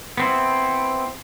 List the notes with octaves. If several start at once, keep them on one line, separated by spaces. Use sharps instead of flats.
B3 C4 E4